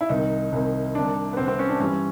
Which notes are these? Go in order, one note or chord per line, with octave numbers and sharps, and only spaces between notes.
E4
C2 C3 D#3 D#4
C2 C3 D#3
C2 C3 D#3 D4
B3
C2 C3 D#3 C4
C4
C#4
D4
G2 E3 G3 C#4